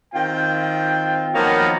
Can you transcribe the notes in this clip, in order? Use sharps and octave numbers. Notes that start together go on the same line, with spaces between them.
D#3 C4 F4 G5
D#3 F3 F#3 A#3 B3 D#4